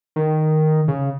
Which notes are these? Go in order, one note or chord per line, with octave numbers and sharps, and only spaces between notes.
D#3
C#3